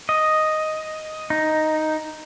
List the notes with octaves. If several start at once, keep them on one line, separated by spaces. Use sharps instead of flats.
D#5
D#4